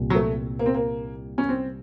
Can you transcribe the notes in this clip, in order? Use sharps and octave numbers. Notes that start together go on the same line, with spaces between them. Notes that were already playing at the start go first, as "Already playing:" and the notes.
Already playing: C2 A#2
F#3
A3
A#3
C4
A#3
C#4
C4